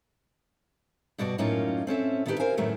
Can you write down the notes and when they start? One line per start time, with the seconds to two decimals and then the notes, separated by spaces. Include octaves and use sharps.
1.18 G2 B2 F#4 D5
1.38 F#2 A2 A#3 C#4 D#4 F4
1.87 C4 C#4 A4 E5
2.26 D3 D#3 E4 F4 G4 B4
2.40 A#4 C5 F5 G#5
2.57 F#2 A2 D#3 A3 B3